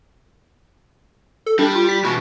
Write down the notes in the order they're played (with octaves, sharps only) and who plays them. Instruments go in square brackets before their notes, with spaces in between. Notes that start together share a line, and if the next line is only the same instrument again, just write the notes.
[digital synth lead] A4
[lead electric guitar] G3 [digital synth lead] D4
[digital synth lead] F4
B6
[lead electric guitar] B2 E3 [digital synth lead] F#4